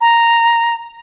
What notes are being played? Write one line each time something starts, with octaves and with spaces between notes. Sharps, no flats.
A#5